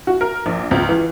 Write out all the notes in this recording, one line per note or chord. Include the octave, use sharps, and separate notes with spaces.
F#4
A#4
A#1
C#2
E3